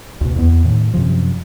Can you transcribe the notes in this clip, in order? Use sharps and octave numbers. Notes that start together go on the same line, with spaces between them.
D2 B2
E2 B3
A2 D#3
F#2 C3 F3